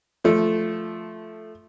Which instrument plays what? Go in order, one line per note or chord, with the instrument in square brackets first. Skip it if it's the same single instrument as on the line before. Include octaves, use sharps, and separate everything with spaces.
[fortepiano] F3 A3